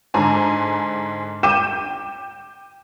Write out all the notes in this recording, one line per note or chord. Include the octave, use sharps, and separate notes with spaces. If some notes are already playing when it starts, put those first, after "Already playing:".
G#2 D3 G#5 A#5
G5 D6 G6 D#7 E7